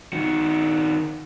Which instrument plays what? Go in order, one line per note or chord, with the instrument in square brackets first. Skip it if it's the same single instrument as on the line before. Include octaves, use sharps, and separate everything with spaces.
[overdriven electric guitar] D#3 F#4